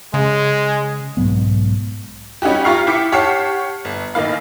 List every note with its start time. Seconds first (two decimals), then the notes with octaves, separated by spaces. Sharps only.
0.14 C#3 G#3
1.17 B1 G#2 F#3 B3
2.42 G3 C#4 D#4 F#4 G4
2.65 F4 G4 A#5 C#6 F6 C7
2.87 E4 G5 D6 B6 C#7
3.12 G4 C#5 F#5 A5 F6 C7
3.85 G1
4.14 A1 D#3 A#3 F5 B5